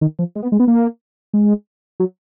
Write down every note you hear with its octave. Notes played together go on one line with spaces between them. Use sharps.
D#3
F3
G#3
B3
G#3
B3
A#3
G#3
F#3